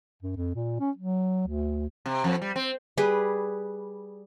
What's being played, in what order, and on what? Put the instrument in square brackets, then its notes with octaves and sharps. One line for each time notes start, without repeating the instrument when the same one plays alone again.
[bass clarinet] F#2
F2
A#2
C#4
F#3
D2
[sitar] C3
F2
G3
C4
[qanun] G3 G#4 B4